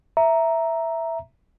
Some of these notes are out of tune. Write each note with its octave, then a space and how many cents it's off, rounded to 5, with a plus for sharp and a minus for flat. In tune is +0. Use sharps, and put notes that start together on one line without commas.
E5 +0 A#5 +0